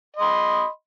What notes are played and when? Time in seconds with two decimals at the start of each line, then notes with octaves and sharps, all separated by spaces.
0.17 D#5
0.20 C6
0.22 B5